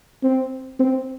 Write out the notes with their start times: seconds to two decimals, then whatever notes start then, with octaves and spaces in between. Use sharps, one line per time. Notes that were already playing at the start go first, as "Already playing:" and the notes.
0.23 C4
0.79 C4